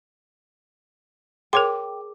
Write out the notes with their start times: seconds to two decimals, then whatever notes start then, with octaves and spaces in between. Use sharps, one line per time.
1.53 G#4 A#4 C#5 G5 A5 C6 D6